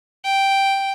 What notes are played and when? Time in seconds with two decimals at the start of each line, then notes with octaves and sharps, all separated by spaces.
0.24 G5